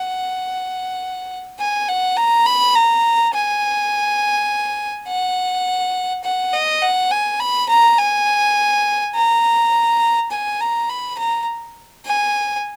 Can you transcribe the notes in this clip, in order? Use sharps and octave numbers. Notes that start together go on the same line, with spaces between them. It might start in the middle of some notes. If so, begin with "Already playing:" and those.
Already playing: F#5
G#5
F#5
A#5
B5
A#5
G#5
F#5
F#5
D#5
F#5
G#5
B5
A#5
G#5
A#5
G#5
A#5
B5
A#5
G#5